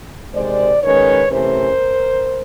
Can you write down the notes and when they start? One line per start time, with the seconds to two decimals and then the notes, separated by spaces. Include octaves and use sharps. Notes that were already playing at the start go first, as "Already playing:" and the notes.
0.34 C3 D#3 G#3 C5 D5
0.83 D#3 G#3 C#4 B4 C#5
1.30 C3 E3 A3 C#4 A#4 C5